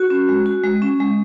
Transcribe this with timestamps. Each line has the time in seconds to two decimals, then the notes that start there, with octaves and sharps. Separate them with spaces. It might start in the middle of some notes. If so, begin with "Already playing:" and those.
Already playing: F#4
0.10 C#4
0.29 G#3
0.46 F#4
0.64 G#3
0.82 C#4
1.00 G#3